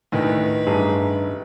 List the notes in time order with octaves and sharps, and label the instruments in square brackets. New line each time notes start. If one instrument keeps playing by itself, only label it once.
[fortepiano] D2 [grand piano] A2 D#3 [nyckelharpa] B4
[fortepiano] A1 [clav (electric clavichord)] G2 G#4 A#5